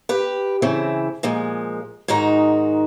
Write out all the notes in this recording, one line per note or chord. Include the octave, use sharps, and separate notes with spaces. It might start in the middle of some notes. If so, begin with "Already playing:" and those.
G4 B4
C#3 E3 C4 E4
A#2 F3 G#3
G#2 D#3 D#4 F#4 A#5